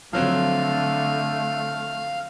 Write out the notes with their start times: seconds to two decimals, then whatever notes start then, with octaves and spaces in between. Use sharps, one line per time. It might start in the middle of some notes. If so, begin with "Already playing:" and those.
0.13 D3 F3 F#3 A3 C4 F5